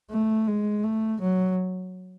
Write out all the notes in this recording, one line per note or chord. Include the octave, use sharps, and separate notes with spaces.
A3
G#3
A3
F#3